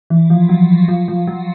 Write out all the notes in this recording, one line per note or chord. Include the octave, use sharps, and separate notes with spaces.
E3
F3
F#3
F3
F3
F#3